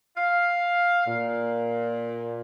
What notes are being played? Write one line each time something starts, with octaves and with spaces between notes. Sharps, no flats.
F5
A#2